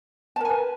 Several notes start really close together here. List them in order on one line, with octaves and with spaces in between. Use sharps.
A5 A#4 G#5 B4